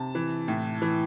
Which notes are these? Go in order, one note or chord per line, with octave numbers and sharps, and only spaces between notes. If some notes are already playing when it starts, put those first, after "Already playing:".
Already playing: C3 A5
E3
A2
E3